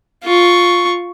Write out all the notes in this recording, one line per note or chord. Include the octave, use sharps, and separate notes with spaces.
F4 C#6